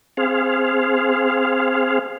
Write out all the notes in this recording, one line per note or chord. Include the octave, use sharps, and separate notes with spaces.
C4 G#4 F5